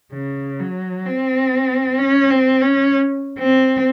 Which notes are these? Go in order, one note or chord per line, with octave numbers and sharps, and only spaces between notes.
C#3
F#3
C4
C#4
C4
C#4
C4